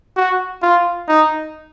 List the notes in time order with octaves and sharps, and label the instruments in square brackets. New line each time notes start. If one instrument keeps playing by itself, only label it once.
[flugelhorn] F#4
F4
D#4